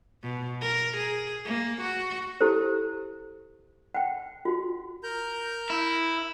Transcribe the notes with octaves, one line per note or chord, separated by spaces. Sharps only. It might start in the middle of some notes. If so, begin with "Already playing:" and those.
B2
A#4
G#4
A#3
F#4
E4 G4 A4 C5
F#5 G5
F4 F#4
A#4 A#5 G6
E4